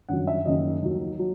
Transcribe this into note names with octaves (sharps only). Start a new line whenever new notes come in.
G1 F#2 D#3 F#3 F#5
E5
F#1 F#2 D#3 F#3 D#5
D#2 D#3 F#3
F#3